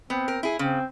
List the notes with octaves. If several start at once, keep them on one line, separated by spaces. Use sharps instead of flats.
B3 C4
A#4
E4 G#4
C#3 C4